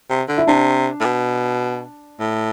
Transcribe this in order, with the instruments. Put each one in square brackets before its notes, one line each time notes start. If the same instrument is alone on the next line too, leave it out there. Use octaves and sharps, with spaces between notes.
[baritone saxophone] C3
D3
[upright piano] E4
[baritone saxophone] C3 [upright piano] D4
[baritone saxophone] A2
B2
A2